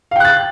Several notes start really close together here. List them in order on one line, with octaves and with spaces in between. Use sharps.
F5 G5 F#6 A6